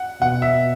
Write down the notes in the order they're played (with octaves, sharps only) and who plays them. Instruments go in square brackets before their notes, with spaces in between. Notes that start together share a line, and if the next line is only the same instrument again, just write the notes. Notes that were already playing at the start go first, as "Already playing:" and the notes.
Already playing: [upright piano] F#5
[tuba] B2 [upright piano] F#5
[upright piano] E5